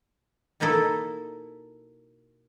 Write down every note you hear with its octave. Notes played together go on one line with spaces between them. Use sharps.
B2 A#3 D#4 E4 A4